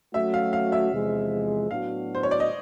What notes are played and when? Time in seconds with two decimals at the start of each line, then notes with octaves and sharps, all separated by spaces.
0.14 F#3 A3 C#4 F#4 E5
0.34 F5
0.53 F5
0.72 E5
0.92 E2 C3 F3 G#3
1.70 A2 F#3 B3 D4 F#4 F5
2.15 C5
2.23 C#5
2.31 D5
2.40 D#5